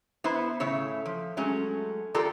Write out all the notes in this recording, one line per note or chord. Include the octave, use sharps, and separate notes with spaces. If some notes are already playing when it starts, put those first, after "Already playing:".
B3 E4 C5
A2 C#3 C#5 E5
F3
F#3 G#3 A3 C#4
F4 G4 A4 A#4 D5